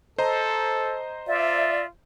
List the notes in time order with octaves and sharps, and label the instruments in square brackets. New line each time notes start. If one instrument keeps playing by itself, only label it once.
[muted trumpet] A4 [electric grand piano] C5 D#5 A#5
[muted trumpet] F4 [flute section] D5 E5